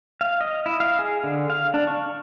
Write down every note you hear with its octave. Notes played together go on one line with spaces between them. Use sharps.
F5
D#5
E4
F5
G#4
D3
F5
D4
C#6